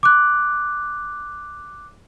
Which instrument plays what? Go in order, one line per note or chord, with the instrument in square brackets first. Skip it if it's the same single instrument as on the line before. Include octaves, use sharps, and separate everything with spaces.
[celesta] D6 F#6